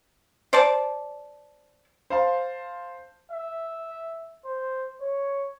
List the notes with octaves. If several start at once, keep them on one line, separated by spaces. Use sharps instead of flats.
C5 D5 A5
C5 F5 A5
E5
C5
C#5